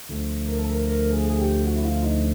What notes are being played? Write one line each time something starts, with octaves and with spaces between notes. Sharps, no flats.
D2 D3 F3 A3
A#4
A4
A#4
A#4
G#4
G#4
G4
F#4
E4
F4
D#4